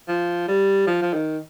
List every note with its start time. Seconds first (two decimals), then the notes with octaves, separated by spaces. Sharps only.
0.08 F3
0.48 G3
0.87 F3
1.02 F3
1.14 D#3